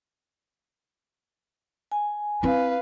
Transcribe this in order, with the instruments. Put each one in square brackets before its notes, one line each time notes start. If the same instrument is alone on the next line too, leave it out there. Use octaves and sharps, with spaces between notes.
[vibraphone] G#5
[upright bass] C4 E4 [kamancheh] B4 F5